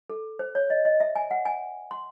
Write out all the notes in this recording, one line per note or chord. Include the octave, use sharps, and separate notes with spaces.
A4
C5
C#5
D#5
D#5
E5
G#5
F#5
G#5
C6